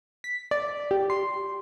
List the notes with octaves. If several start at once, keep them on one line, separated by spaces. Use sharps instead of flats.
B6
D5
G4
C6